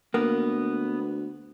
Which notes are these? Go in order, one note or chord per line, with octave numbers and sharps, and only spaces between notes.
D2 A#3 B3